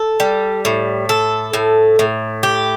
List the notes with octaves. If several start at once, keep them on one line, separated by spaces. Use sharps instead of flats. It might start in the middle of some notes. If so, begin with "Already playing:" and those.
Already playing: A4
G3
A2
A4
A2
A2
G4